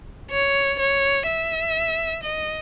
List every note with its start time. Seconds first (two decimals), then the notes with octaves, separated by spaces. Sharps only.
0.31 C#5
0.79 C#5
1.27 E5
2.23 D#5